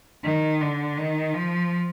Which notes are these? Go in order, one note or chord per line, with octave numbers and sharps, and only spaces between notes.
D#3
D3
D#3
F3